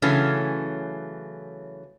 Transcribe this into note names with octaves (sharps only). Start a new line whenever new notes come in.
C#3 E3 F#3 A3 C#4